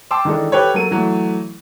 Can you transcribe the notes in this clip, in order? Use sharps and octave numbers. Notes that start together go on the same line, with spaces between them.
G5 A5 C6 D6 E6
D#3 E3 G#3 D4 A4
G4 A4 B4 C#5
F#3 A#3 A4 D#7
E3 F#3 A3